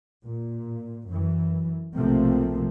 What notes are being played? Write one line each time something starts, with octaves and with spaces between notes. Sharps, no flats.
A#2
F#2 E3
B1 C3 F3 A3 A#3 C4